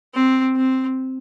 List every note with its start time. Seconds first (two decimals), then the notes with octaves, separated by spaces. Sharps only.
0.14 C4
0.56 C4